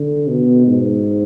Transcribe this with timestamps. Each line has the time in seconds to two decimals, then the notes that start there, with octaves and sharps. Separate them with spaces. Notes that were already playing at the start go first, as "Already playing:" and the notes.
Already playing: D3
0.28 B2
0.67 G#2